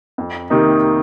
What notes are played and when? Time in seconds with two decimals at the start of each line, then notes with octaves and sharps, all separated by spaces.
0.18 F2
0.50 C3 D#3 A#3 D#4